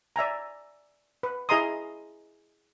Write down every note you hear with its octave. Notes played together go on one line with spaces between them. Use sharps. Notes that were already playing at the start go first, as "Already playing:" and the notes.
D5 E5 G#5 A#5
B4
E4 G#4 D#5 A#5 C6 D#6